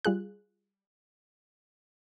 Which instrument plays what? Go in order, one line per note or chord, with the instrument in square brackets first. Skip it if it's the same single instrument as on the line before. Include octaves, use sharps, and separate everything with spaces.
[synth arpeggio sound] G3 F4 G#4 F#6